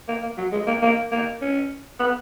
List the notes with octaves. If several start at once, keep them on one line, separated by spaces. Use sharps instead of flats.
A#3
A#3
F#3
G#3
A#3
A#3
A#3
C#4
B3